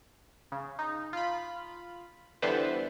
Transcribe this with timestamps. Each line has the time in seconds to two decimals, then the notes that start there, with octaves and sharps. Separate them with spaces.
0.52 C#3
0.79 D#4
1.13 F4 B5
2.42 D3 E3 G3 B3 B4 C5